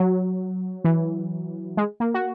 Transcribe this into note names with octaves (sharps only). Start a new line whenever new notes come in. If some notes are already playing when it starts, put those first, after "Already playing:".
Already playing: F#3
E3
G#3
A#3
F#4